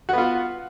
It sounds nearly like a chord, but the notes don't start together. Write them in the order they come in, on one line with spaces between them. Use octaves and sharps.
F#4 B3 F4